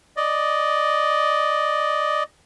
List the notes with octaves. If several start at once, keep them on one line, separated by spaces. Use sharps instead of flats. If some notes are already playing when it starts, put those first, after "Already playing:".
D5 D#5